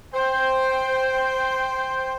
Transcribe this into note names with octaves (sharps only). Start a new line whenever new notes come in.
C5 G5